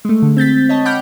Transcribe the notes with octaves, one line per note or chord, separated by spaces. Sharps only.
G#3 A3
D3
C4 G6 A6 B6
C#5 D#5 A5
F#5 G5 B5 D6 F6 G6